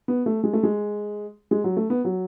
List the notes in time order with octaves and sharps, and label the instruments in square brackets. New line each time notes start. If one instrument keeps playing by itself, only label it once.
[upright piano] B3
A3
G#3
A3
G#3
G#3
F#3
A3
B3
F#3